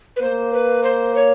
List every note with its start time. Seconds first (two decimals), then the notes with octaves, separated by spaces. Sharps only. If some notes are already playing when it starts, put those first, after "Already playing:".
0.16 B4
0.22 A#3 C5
0.53 B4
0.83 C5
1.15 C#5